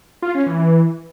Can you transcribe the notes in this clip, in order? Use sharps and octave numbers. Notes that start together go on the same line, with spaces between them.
F4
C#4
E3
E3